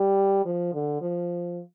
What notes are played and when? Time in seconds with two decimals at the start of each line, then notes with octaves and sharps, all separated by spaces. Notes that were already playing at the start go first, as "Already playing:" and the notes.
Already playing: G3
0.45 F3
0.74 D3
1.01 F3